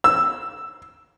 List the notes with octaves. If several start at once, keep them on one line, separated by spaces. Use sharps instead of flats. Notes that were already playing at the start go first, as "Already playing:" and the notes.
E6